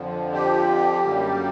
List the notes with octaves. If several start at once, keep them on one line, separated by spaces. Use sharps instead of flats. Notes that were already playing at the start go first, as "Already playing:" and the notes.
Already playing: F2 D3 F3
G4
F#2 D3 G3 A#3